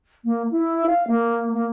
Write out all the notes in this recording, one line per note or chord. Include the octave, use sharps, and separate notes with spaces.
A#3
E4
F5
A#3
A#3